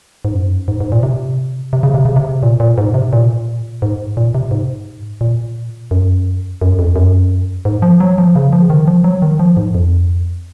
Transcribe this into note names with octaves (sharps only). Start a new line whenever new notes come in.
G#2
F#2
G#2
G#2
A#2
C3
C3
C#3
C3
C#3
C3
A#2
A#2
G#2
C3
A#2
G#2
A#2
C3
G#2
A#2
F#2
F#2
F2
F#2
G#2
F3
F#3
F3
C#3
F3
C#3
D#3
F3
F#3
D#3
F3
G#2
F2